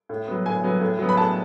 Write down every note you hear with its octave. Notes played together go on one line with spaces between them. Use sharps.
A2
F#3 B3
A2 G#5
F#3 B3
A2
F#3 B3
B5
A2 A5